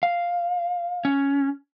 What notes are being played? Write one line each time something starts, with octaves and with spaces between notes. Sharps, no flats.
F5
C#4